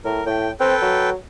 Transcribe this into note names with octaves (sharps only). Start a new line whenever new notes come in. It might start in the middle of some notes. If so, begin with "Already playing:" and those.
A2 A#4
A2 G5
C4 A4 B4 G5
F#3